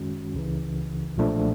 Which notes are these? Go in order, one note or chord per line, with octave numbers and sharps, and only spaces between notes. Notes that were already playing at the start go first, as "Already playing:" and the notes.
Already playing: F#2 D#3 G#3 C#4 F#4
C#2 C#3 E3
B1 A#2 F3 A3 D4